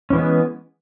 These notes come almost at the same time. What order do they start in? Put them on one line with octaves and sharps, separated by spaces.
C#4 E3 G#3 B3